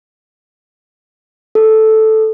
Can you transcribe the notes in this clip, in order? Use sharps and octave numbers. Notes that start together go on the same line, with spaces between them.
A4